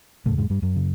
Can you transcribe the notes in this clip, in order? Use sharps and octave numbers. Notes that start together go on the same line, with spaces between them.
E2 A2 C#3 A3
G#2 G#3
G2 G3
F#2 F#3
C#3